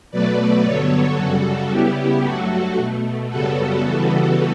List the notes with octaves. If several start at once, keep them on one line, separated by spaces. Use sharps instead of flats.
B2 F#3 A3 B4 D5
G2 D3 F#3 B3 A4 C#5
F#2 C#3 G3 F#4 A4
C#3 G3 B3 E4 G4
G2 F#3 A3 F#4 A4
B2 A3
F#2 C#3 G3 B3 F#4 A4
C#3 E3 G3 B3 F#4 A4